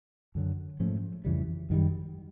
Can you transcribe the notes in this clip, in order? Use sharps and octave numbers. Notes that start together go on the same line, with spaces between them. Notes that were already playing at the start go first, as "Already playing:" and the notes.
F#2 D3 F#3
G#2 F3 A3 C#4
F2 C#3 E3 G3
F#2 D#3 G3